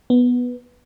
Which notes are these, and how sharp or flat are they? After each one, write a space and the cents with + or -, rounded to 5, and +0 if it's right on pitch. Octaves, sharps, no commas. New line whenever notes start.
B3 -5